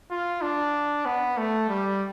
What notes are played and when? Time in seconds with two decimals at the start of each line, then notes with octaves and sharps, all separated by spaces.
0.10 F4
0.42 D4
1.05 B3
1.37 A3
1.69 G3